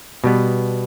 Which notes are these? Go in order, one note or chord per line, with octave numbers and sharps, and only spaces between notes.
B2 G3 B3